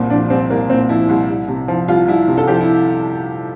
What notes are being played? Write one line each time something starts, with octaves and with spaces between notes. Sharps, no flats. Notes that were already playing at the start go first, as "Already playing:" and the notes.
Already playing: C2 A#2 C4
F3 D4
C2 C4
C2 A#3
A#2 C4
F3 E4
C2
C2
C3
F3
C2 F4
C2 E4
C3
A4
F3 G4
E4